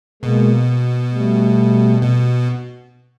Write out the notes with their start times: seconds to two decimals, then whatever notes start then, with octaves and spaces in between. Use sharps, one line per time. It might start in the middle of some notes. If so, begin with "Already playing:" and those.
0.22 B2 G#3 A#3
1.11 G3 A3
2.01 B2